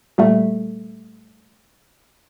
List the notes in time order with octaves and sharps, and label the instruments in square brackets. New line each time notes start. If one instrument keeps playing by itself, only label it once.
[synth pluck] A#2 G3 A3